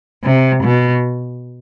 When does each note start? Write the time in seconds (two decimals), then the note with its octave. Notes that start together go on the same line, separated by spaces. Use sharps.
0.24 C3
0.64 B2